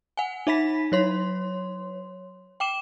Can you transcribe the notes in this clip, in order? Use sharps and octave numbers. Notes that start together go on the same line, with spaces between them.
F#5 G#5
D#4 E5 B5 B6
F#3 C#5 C6
G5 D6 E7